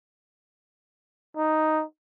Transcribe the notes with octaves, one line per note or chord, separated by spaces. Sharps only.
D#4